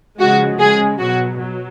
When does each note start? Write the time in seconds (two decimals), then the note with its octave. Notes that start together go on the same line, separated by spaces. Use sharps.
0.19 C#3 F3 G#3 F#4
0.59 C#3 G#3 G#4
1.00 B2 F#3 F#4
1.39 F#3